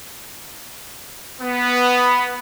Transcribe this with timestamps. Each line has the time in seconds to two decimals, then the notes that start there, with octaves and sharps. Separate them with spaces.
1.41 B3